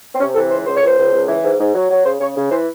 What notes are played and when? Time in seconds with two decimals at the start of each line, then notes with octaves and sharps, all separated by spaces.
0.14 C4
0.20 C3 C#4
0.35 E3 A4
0.50 C#2 C5
0.66 C#2 C5
0.77 C#2 C#5
0.87 C5
0.98 C#2
1.12 C#2
1.28 E3
1.43 G#2
1.59 G#2
1.75 F#3
1.90 F#3
2.05 C#3 C5
2.20 C#3 C#5
2.37 C#3
2.51 E3 C5